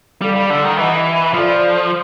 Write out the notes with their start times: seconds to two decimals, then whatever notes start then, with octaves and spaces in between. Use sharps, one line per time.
0.21 G3 E4 A4 D5 F5
0.35 G3
0.50 D3
0.64 D#3
0.77 E3 G4 B4 D#5 F#5
1.34 F3 F4 A4 D5 F5